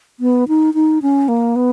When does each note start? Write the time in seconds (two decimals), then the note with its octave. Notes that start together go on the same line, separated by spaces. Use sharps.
0.20 B3
0.48 D#4
0.74 D#4
1.02 C#4
1.28 A#3
1.56 B3